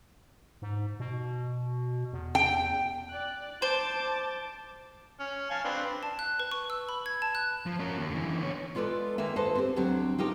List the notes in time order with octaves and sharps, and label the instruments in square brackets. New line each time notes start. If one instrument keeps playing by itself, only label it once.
[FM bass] G#2
B2
E2
[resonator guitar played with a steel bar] G5
[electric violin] D5 F#6
[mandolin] C5 [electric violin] A5 D6
[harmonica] C#4
F5 G#5 A5
C4 D4 B4
[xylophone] A5
F#6
B4
C#6
E6
B5
G#6
A5
F#6
[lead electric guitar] F3
C#4 A#4
D#2
D3 E3
B3 C#5
[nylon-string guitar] G#3 F4 A4 B4 D5
D#3 G#3 A#3 E5
A4 B4 C5 D#5 A5
C4 G4
D2 F#3 C4 G4
D#4 F4 G4 A#4